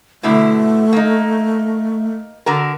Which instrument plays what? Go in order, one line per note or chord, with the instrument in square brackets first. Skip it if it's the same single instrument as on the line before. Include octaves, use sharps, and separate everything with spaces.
[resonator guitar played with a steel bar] B2 D3 E4 [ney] A3
[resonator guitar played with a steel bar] A#3 D#4
D3 F#4 A#4